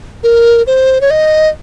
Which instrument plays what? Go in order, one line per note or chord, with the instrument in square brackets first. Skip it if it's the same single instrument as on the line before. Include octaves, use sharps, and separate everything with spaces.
[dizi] A#4
C5
C#5
D#5